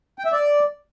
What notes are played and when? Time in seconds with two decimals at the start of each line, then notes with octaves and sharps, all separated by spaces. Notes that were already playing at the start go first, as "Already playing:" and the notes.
0.19 G5
0.25 E5
0.32 D5